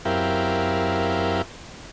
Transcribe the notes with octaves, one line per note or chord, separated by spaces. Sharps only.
F#2 C4 E4 G4 A#4 F5